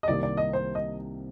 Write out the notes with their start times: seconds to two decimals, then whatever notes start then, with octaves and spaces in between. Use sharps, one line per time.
0.03 D#5
0.08 C2 C3 D#3 A#3 D5
0.23 D5
0.37 D#5
0.53 C5
0.75 D#5